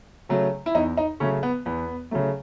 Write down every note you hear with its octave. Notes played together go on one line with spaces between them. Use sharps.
C#3 F#3 A3
E4
E2 D#4
D#4
C#3 F#3 A3 C#4
B3
E2 B3
C#3 F#3 A3